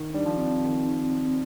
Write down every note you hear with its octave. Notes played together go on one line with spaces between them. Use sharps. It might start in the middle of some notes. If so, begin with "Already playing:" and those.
Already playing: D#3
G3 D4
F3
C4
D#3